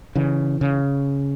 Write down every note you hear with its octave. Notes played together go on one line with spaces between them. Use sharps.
C#3 E3
C#3